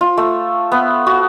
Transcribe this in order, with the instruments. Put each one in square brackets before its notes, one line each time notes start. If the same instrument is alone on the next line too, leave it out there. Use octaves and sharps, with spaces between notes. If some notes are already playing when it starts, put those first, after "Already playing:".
[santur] F4
A3
B3
F#4